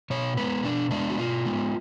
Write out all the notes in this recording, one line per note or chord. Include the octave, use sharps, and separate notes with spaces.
B2 C#5
G#3 B3 B4
B2 D4
G#3 B3 D4
F#4
B2 F4
G#3 B3